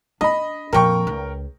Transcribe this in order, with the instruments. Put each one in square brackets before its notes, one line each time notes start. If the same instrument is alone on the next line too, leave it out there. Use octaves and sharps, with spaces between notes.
[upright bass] D4 [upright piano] D#5 B5
[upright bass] F2 A#2 [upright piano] A#4 G5 C#6
[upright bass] C#2